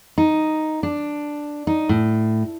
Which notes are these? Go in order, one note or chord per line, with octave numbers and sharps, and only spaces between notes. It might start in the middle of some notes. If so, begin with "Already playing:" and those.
D#4
D4
D#4
A2